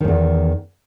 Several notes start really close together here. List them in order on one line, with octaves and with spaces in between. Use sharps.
D#3 G#2 E2